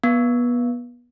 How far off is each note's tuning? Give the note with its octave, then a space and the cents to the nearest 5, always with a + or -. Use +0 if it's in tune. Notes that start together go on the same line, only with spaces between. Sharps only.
B3 -25